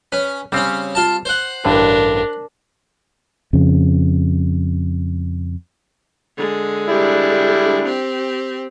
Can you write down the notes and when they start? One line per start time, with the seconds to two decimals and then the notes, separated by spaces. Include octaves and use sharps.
0.12 C#4 B4
0.52 C#3 G3 C4 C#4
0.95 F4 A5
1.25 C5 F#5
1.65 A1 G2 D3 D4 A#4
3.53 F2 C#3
6.37 D3 G#3
6.89 G3 D4 E4
7.85 C4 G4